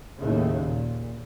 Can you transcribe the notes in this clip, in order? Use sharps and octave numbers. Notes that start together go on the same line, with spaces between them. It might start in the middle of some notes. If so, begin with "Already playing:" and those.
D#2 A2 C#3
A#2